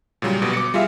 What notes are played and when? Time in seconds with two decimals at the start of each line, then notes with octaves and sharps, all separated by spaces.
0.22 A#2 C#3 F#3 G3
0.42 G1 B2 G3
0.53 D6 C#7
0.74 G3 F4 G#4 E5 F5